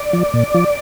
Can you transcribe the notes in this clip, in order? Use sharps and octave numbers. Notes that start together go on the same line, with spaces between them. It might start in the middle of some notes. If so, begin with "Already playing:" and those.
Already playing: D5
F3
A#2
F3